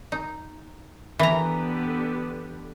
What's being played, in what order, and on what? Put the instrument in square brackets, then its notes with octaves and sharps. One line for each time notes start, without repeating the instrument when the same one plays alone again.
[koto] D#4
[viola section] D3 B3 G4 [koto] E3 A#5